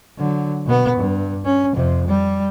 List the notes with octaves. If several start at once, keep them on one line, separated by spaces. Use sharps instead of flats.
D3 F#3
B2 B3
G2
C#4
F2 C3
G3